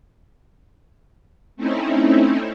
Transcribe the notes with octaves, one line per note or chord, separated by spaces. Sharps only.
A3 C4 C#4 D#4 E4